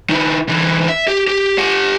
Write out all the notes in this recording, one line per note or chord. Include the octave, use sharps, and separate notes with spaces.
D#3 E4
D3 E3
E5
G4
G4
G4 F#5